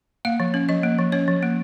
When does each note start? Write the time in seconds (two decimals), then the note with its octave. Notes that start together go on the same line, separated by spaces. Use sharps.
0.25 A#3 F5
0.40 F3
0.54 C#4
0.69 F3 D#5
0.83 A#3
0.98 F3
1.12 C#4 C#5
1.28 F3
1.43 A#3